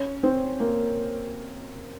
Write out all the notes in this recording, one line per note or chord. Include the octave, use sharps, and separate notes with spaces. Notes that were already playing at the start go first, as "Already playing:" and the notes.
Already playing: C#4 C#5
C4 C5
A#3 A#4